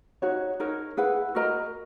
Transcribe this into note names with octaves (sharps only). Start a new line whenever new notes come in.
D#4 F#4 C#5
D#4 A#4 C#5
E4 G#4 B4 F#5
F#4 A#4 D#5 A#5